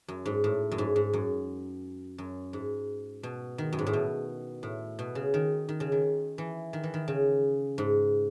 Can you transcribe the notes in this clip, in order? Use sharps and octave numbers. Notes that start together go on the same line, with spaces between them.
F#2
G#2
A2
F#2
G#2
G#2
F#2
F#2
G#2
B2
D#3
F#2
G#2
A2
B2
A2
B2
C#3
D#3
D#3
C#3
D#3
E3
D#3
E3
D#3
C#3
G#2